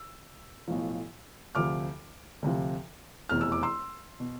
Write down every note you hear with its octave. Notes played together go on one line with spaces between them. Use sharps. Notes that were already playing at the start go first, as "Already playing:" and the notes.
Already playing: E6
B1 A2 F3
D2 C3 F3 D6 F6
D2 C3 F3
F1 E2 B2 F6
E6
D6
C6 E6
B2